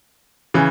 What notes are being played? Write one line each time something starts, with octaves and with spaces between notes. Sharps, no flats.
C#3 E3